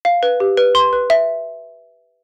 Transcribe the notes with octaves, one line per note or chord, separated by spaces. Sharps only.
F5
B4
G4
B4
C6
B4
E5